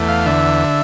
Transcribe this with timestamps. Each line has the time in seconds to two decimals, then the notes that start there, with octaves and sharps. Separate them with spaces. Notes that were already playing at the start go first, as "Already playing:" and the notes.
Already playing: E2 A3
0.08 F5
0.26 D3 E5